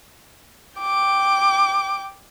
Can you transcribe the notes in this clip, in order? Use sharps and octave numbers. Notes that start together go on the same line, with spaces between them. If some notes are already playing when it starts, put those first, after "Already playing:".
G5 D6